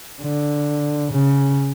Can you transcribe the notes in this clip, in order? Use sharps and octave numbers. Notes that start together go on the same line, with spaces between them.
D3
C#3